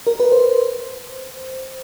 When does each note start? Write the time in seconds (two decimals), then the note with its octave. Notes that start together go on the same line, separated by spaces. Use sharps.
0.07 A#4
0.20 B4
0.32 C5